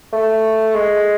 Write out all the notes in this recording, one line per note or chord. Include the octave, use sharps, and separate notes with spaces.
A3
G#3